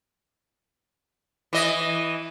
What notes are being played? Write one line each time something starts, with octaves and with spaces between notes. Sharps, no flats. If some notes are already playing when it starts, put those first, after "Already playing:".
E3 D#5